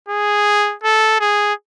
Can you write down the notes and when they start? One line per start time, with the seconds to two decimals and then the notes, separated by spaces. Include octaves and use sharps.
0.09 G#4
0.84 A4
1.21 G#4